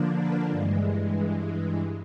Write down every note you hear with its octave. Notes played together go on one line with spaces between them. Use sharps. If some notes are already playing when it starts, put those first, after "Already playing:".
Already playing: D3 F3 A#3 D4
B4
G2 E3 G#3